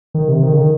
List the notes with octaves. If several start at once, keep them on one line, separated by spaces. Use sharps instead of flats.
D#3
C3
D#3
C#3
D#3